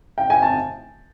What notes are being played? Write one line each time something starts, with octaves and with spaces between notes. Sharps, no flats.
G5
G#5
A5